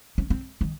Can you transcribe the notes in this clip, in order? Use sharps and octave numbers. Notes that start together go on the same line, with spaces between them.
C#4
C4
D#3